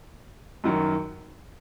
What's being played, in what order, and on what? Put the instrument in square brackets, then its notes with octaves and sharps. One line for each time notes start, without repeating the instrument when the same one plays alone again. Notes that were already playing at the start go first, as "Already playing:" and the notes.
[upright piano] F#2 D#3 F#3